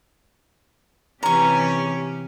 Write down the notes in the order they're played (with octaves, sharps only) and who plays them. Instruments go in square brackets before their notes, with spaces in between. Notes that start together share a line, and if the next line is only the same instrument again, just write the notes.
[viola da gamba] C3 E3 G4 [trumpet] C#4 [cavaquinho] A#5 C#6